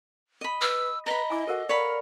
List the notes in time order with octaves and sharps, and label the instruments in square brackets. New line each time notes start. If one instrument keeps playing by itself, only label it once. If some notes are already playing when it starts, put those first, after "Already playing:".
[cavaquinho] D#5 B5
[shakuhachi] B4 [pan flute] E6
[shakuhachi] B4 [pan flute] D#5 [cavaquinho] A#5 B5
[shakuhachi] E4 [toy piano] G#5 D6
[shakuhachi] F#4 [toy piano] A4 A#4 F#5
[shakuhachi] A#4 [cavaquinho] C#5 F5 B5 [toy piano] D5